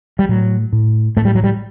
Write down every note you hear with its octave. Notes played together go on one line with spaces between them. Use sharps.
G3
A2 F#3
A2
A2 A3
G3
F#3
G3